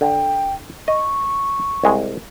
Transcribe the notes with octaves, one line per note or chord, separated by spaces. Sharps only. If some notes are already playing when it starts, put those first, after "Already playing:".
D3 G5
D#5 C#6
C2 G#3 G#5